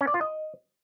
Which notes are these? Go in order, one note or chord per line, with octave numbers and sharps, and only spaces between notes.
C#4
D5
F4
D#5